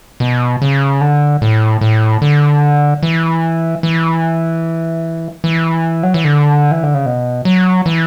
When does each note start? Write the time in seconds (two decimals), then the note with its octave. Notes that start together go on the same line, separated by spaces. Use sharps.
0.20 B2
0.62 C#3
1.01 D3
1.42 A2
1.81 A2
2.22 D3
3.03 E3
3.83 E3
5.44 E3
6.03 F#3
6.14 E3
6.24 D3
6.71 E3
6.83 D3
6.94 C#3
7.06 B2
7.45 F#3
7.86 E3